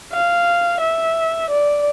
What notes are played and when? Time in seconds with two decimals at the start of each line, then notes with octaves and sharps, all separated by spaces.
0.13 F5
0.81 E5
1.51 D5